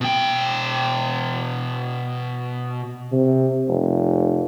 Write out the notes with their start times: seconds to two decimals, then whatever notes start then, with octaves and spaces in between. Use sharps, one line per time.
0.01 B2 G5
3.12 C3
3.68 F1